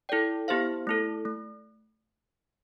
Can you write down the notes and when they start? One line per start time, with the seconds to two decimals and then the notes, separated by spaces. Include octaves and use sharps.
0.09 E4 A4 D5 G5
0.48 B3 E4 G4 C5 F5
0.87 A3 E4 A4
1.25 A3